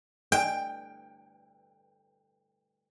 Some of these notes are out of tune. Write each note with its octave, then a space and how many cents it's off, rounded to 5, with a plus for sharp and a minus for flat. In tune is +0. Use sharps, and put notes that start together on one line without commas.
G5 +10